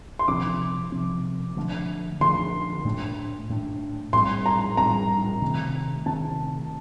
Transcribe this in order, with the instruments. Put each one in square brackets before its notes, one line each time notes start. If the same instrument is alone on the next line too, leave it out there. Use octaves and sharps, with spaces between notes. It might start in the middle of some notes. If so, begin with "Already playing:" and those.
[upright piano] C6
[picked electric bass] C3 F3 C4 [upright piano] D6
[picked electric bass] C3 F3 C4
D3 F3 A3 D4
[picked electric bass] D3 F3 A3 D4 [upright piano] C6
[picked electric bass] A2 A3 D4
A2 A3 D4
[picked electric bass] A2 G3 C4 [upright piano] C6
[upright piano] A#5
[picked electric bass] A2 G3 C4 [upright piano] A#5
[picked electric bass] C3 D#3 A3 C4
[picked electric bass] C3 D#3 A3 C4 [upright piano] A5